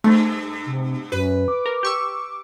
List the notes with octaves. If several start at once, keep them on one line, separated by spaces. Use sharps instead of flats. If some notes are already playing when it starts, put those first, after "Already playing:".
G2 A3
C3
F#2 B4
D6
A#4
G4 C#6 E6